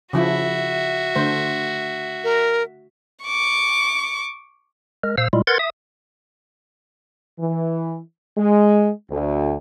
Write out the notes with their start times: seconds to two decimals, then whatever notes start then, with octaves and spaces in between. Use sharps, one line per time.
0.13 C#3 F3 E4 F#4 E5
1.16 D3 A3 C5
2.24 A#4
3.25 C#6 D6
5.04 G#3 A#4
5.18 A#2 C5 F5 E6
5.33 A#2 G3 G#3 E4 F4
5.47 A#4 B4 F#5 C6 G#6 A6
5.59 E5 D#6
7.40 E3
8.38 G#3
9.11 D2